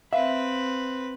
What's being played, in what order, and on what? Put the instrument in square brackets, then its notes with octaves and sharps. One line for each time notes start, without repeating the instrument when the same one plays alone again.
[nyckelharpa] C4 B4 [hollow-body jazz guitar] E5 [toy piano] F5